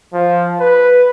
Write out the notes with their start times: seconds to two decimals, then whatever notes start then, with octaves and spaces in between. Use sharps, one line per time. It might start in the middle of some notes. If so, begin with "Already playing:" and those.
0.14 F3
0.60 B4